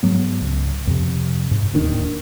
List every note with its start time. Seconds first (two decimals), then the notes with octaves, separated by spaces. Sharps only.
0.03 G#2 F#3 B3
0.41 C#2
0.87 F2 C3
1.51 G#2
1.73 D1 D#2 D#3 D4